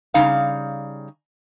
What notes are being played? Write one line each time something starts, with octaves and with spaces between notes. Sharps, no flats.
C#3 G3 D#4 F5